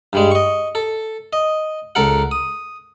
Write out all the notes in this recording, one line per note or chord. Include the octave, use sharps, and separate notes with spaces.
G2 G3 G#3
D#5 C#6
A4
D#5
C#2 A4 A#4 F#5
D#6